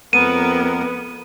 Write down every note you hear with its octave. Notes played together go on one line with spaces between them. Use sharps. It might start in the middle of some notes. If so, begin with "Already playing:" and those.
F2 B3 A#4 F#5 D#7